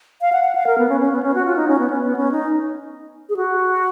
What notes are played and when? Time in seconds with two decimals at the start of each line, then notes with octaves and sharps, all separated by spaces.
0.21 F5
0.32 F#5
0.44 F#5
0.55 F5
0.67 A#4
0.78 B3
0.89 C#4
1.00 C#4
1.12 B3
1.23 C#4
1.34 F#4
1.45 F4
1.56 D#4
1.68 C#4
1.79 B3
1.90 C#4
2.01 B3
2.16 C#4
2.32 D#4
3.29 G#4
3.37 F#4